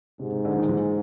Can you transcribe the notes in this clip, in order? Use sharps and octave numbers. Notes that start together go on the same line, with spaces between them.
G#2 C3
C3
D3
D#3
E3